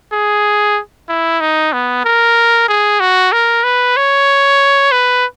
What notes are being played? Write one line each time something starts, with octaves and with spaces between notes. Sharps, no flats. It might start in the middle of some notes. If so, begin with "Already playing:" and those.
G#4
E4
D#4
B3
A#4
G#4
F#4
A#4
B4
C#5
B4